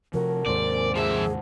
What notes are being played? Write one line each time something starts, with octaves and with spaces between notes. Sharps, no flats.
C3 F3 F#4 A4 A#4 C#5
D#2 G#2 C3 G#4 C5 D5
G#5 C6
F3 A#3 D4 G#4 E5 F#5